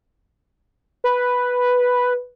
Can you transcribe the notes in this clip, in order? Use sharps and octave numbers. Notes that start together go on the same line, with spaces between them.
B4